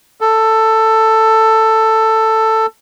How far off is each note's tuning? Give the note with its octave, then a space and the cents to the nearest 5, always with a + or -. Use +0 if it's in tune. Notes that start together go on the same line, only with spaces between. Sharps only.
A4 +10